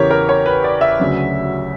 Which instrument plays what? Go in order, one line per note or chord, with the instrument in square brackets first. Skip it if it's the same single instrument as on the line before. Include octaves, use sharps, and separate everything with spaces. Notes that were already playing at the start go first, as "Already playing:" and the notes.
Already playing: [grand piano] E2 C#3 E3 G4 A#4 C#5
A#4
C#5
B4
D5
E5
D2 C#3 F#3